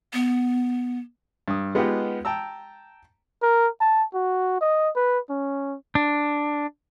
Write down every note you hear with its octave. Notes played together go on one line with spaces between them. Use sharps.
B3
G2 D#6
G#3 B3 D#4 F4 G4 F#5
G5 A5 A#5 E6
A#4
A5
F#4
D#5
B4
C#4
D4